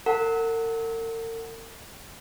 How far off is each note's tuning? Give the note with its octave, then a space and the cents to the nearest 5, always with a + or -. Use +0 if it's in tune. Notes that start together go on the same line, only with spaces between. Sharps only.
A#4 -45 F#5 +0 A5 +0